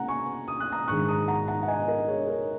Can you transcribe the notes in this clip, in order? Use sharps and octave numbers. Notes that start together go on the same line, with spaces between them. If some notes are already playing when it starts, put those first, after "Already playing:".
Already playing: C#3 A#3 F#5 A#5
G#5 C#6
D#6
F#6
A#5 D#6
A#1 G#2 D#3 G#3 C#6 F#6
A#5 D#6
F#5 A#5
F#5 A#5
F#5
D#5 G#5
A#4 D#5
G#4 C#5
A#4